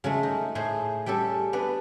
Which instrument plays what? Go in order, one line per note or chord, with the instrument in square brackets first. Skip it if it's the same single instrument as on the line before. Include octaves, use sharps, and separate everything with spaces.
[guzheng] C#3 G#3 A3
D#4
A2 A3 G#4 C5
G3 C#4 G4 A4
B3 D4 B4